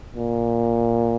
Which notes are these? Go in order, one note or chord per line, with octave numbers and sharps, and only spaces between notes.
A#2